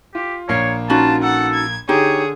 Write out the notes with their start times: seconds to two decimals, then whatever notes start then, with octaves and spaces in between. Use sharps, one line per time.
0.15 F4 G4
0.49 A#1 A#3 C#5 C7
0.90 C#4 D#4 F4 F#4 A5
1.23 A4 F#5
1.53 G#6
1.89 D3 D#4 G4 G#4 C#5